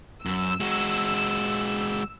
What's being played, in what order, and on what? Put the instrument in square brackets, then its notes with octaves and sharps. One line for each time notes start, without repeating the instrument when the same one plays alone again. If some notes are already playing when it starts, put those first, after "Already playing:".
[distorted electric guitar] F#2 [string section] E6
[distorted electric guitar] G#3 F#4